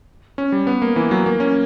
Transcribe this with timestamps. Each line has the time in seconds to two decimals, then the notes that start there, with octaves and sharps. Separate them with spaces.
0.38 C#4
0.52 G3
0.67 B3
0.82 A#3
0.96 E3
1.11 F#3
1.26 A#3
1.40 C#4